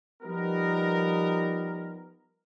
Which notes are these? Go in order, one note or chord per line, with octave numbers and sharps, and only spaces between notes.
F3 G3 B3 D#4 G4 A#4